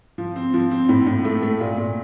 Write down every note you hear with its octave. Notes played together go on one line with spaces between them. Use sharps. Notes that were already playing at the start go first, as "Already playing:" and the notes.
F3
C4
F3
C4
A2
A2
A3
A3
A#2
A#2